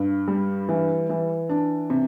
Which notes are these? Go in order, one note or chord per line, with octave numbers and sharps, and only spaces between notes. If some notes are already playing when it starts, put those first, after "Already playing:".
Already playing: G2
G3
E3
E3
D4
C3